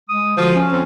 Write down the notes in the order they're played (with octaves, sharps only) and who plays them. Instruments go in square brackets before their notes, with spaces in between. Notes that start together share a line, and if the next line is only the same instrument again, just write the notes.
[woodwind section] G#3 D#6
[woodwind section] D3 F#4 C5 [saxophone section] F3
[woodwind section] C#4
[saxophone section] F2 C4